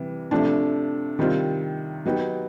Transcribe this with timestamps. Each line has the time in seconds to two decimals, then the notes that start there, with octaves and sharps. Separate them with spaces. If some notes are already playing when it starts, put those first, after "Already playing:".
Already playing: C3 E3 G3
0.31 C3 F3 A3 D4
1.19 C3 D#3 G3 C4 F4
2.05 F#3 B3 D#4 G4